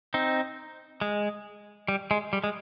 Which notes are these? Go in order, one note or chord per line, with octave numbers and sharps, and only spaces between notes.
C4 D#4
G#3
G3
G#3
G3
G#3